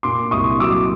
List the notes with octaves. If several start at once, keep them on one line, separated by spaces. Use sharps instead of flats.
A#2 C6 D6
C2 C#6 D#6
F#3 D6 E6